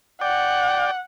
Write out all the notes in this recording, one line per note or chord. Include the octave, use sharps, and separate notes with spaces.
D5 F#5 G5